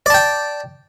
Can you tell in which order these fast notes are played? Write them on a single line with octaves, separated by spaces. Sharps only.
D5 A5 G5